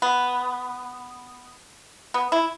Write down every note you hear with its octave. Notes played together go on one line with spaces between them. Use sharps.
B3
B3
E4